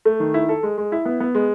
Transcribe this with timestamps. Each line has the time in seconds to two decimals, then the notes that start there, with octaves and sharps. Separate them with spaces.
0.05 A3
0.20 D#3
0.34 E4
0.49 A4
0.63 G#3
0.78 G#3
0.92 E4
1.05 B3
1.20 B3
1.35 G#3